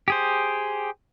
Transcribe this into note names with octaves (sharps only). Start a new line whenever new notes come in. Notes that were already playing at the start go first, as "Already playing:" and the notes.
G4 G#4 C5